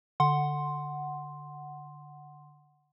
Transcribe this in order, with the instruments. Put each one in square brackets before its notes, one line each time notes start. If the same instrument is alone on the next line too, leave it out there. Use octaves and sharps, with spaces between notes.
[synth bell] D3 F#5 C6